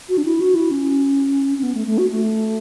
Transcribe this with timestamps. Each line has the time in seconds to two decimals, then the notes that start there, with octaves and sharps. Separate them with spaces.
0.09 F#4
0.18 D4
0.25 E4
0.40 F#4
0.55 E4
0.71 C#4
1.58 C#4
1.63 B3
1.75 A3
1.87 A3
1.98 F#4
2.10 A3